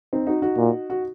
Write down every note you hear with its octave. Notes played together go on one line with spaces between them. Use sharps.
C4 D#4
D#4 F#4
D#4 F#4
A#2
F#4